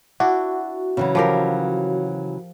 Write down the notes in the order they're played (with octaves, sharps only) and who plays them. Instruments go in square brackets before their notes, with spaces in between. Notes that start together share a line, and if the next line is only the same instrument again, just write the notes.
[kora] D4 E4 [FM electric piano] F#4
[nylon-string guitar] C#3 E3 F#3
[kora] F3 G4 A#4